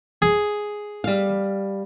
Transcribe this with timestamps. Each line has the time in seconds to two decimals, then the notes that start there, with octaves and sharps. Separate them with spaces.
0.22 G#4
1.04 G3 F5